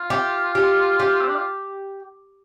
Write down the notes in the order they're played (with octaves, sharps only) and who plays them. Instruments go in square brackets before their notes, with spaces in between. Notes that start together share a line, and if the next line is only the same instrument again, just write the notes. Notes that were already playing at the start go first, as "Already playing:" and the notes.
Already playing: [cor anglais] F4
[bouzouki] G4
G4
G4
[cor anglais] C4
D4
F4